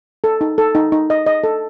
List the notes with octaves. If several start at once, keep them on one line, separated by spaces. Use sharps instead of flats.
A4
D#4
A4
D#4
D#4
D#5
D#5
A4